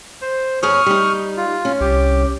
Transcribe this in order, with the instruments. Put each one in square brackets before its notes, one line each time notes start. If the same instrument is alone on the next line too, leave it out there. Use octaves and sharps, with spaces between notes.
[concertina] C5
[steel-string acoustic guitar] E2 G#4 C#5 [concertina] C#6 D#6 F6
[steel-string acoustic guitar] G3 D#4
[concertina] F4
[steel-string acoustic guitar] C#4
[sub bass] C2 [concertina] G4